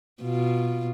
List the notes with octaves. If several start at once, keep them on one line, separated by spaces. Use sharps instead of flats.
B2 F4